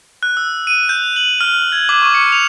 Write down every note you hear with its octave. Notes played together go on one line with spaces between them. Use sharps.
F#6
E6
D#7
G6
F7
F#7
F6
G#6
D6
C#6
C#7
F7